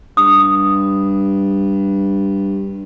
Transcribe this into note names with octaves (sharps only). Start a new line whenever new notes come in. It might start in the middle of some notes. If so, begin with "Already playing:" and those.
G2 D#6